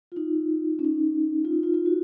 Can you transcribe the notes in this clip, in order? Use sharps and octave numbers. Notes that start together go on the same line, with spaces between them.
F4
D#4
C#4
D#4
F4
D#4
F4
F4
F#4